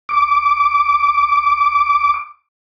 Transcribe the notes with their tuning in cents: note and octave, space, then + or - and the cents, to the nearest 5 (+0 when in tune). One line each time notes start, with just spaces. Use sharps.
D6 -5